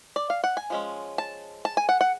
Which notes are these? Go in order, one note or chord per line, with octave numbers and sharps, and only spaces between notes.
D5
F5
F#5
G#5
F3 G#3 C#4
A5
A5
G#5
F#5
F#5